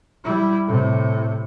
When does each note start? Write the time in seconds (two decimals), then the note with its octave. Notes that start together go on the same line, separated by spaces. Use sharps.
0.24 G3 E4
0.67 A2 C3